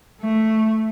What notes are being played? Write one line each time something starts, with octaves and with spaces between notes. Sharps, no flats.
A3